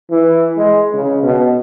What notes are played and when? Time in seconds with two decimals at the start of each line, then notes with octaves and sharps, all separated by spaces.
0.11 E3
0.57 G#3
0.94 C#3
1.23 B2